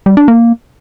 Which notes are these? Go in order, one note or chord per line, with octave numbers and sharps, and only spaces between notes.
G3
D4
A#3